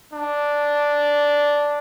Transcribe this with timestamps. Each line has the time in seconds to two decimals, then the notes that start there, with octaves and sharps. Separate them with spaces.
0.14 D4